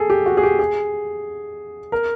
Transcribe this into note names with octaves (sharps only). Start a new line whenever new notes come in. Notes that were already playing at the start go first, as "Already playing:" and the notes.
Already playing: G#4 A4
G4
F#4
G#4
G4
G#4
A#4